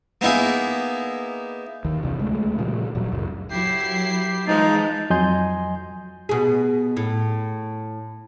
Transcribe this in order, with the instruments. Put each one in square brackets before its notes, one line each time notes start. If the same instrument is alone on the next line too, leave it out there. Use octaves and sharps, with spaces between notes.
[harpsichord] A#3 B3 D#4 E4 G#4
[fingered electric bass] D#2 D#3
E1 C2 C3 E3
D2 G#3 A3
A#2 C#3 F3 G3
D#1 A#2 F#3
C#2 F#2
[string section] F#3 E4 C7 [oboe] G4
[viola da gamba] E3 F3 G#3 [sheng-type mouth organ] D#4 [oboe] A5
[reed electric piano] F2 F#3 D#5 G#5 C6 G6
[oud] B2 G#4
A2